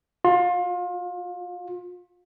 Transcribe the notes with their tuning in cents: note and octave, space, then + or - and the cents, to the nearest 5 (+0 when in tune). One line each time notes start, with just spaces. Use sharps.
F4 +30